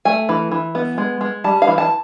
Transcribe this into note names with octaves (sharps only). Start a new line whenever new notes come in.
A3 G#5
E3
E3
B3
G#3
G#3
G3 A5
F5
E3
A5